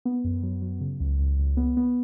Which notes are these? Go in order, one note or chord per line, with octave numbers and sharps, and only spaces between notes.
B3
F#2
F#3
F#3
C#3
C#2
C#2
C#2
B3
B3